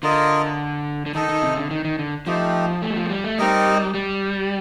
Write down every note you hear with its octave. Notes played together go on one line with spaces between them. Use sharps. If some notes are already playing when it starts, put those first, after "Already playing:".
D3 F4 A#4 D#5
D3
D#3 D#4 A4 D#5
D#3
C3
D3
D#3
D#3
D3
F3 A3 C4 D#4 G4
A3
G3
F3
A3
G3
A3
G3 C4 D#4 A#4 D#5
G3